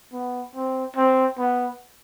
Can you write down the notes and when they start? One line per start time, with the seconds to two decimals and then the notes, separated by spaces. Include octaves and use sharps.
0.13 B3
0.55 C4
0.97 C4
1.39 B3